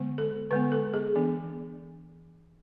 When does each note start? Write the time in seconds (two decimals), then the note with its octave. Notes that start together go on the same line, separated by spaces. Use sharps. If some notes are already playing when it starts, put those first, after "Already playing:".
Already playing: D3 G#3 B3
0.18 A4
0.50 D3 G#3 B3 B4
0.72 A4
0.94 G#4
1.15 E3 B3 D4